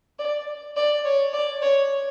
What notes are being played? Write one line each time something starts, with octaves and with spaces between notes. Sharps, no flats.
D5
D5
C#5
D5
C#5